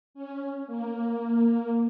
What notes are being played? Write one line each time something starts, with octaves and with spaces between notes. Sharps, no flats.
C#4
A#3